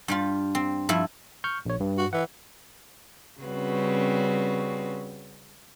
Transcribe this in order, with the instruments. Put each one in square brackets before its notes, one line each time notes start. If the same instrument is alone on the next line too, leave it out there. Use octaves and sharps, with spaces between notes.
[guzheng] G2 G3 F4
C4
G2 F3 E4
[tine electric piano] C#6 F6 G6
A#1 C#5
G2
[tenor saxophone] F#4
[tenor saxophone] E3 [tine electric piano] F#5
[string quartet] C#3 G3 C4 C#4 F#4 B4